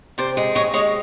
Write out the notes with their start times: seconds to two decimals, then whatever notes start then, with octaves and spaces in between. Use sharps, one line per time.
0.18 C3 C5 D5
0.37 G#3
0.55 D#2 C#5 D#5
0.73 G#3 C#5 D#5